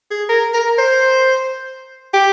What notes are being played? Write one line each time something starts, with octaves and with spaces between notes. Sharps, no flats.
G#4
A#4
A#4
C5
G4